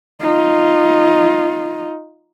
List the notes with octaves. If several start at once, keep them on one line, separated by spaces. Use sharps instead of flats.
D#4 F4